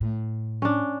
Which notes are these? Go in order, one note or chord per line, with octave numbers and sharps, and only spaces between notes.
A2
C#4 D4